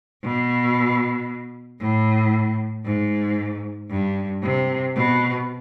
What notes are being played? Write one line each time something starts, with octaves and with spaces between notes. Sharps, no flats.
B2
A2
G#2
G2
C3
B2